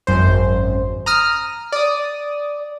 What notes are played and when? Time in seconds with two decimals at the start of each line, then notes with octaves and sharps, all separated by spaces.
0.07 G#1 F#2 C5
1.06 A#5 D#6 F6
1.72 D5 D#6